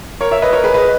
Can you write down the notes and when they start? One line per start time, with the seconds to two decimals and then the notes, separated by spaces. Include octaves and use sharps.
0.21 A#4 C#5
0.31 C#5 E5
0.42 B4 D#5
0.53 A#4 C#5
0.64 G#4 B4
0.74 B4 D#5